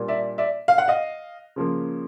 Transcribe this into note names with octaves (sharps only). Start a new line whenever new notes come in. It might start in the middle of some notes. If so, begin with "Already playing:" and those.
Already playing: A#2 G3 A#3 D4
D5 E5
D5 E5
F5
F#5
D#5 F5
C#3 F3 A#3